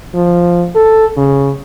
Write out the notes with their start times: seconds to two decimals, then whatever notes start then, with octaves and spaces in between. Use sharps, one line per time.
0.15 F3
0.75 A4
1.17 C#3